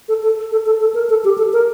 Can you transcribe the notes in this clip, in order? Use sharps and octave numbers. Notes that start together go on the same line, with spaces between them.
A4
A4
A4
A4
A4
A#4
A4
G4
A4
A#4